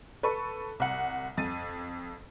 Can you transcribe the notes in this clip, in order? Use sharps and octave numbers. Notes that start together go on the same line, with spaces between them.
A4 B4 C#6
C2 F#5
F2 A6 D#7